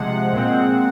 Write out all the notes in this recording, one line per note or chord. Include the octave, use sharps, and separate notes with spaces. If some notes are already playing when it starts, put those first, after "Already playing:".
Already playing: C3 F3 G#3 F#5
A#2 G#3 C4